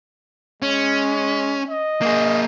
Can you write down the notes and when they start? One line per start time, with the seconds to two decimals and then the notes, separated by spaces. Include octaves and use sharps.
0.62 G#3 C#4
1.69 D#5
2.02 A#3 G#4